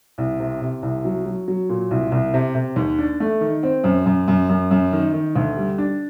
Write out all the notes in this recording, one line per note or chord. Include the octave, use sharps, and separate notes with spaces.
C2
C3
C3
C2
F#3
F#3
F#3
A#2
C2
C2
C3
C3
D#2
D4
A3
D#3
C4
F#2
F#2
F#2
F#2
F#2
D#3
D#3
D2
G3
D4